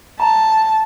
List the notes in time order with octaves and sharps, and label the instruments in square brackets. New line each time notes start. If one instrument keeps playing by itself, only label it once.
[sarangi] A5 [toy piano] A#5